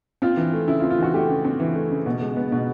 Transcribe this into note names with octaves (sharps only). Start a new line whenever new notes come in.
C4 F4
E3
A3
C#3 E4
F4
C4
F4
E3 F#4
A3 G4
C#3
C4
E3
A3
C#3
B2
G#3
B3
B2